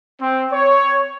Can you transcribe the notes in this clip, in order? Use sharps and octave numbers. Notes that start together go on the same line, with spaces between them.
C4
C#5